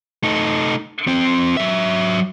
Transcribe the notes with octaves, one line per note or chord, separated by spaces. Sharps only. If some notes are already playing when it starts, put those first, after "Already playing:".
A3 D#4
F3 C4
F#3 E5